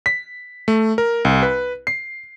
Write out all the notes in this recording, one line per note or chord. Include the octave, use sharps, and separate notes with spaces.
B6
A3
A#4
C2
B4
C7